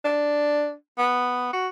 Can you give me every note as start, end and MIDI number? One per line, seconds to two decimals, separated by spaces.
0.05 0.73 62
0.98 1.53 59
1.53 1.68 66